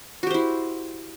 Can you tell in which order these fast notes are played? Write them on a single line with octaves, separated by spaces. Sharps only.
F#4 G4 C5 E4